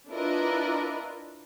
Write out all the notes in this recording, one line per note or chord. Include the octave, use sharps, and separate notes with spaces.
D4 E4 F4 A#4 B4 D#5